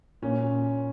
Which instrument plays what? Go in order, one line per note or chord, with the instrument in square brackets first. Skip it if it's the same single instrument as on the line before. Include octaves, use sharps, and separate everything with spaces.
[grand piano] A#2 C#4